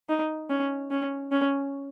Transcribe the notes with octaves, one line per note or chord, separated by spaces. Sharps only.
D#4
C#4
C#4
C#4